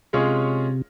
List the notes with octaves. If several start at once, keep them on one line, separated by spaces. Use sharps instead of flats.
C3 G#3 C#4 F4 G#4 C#5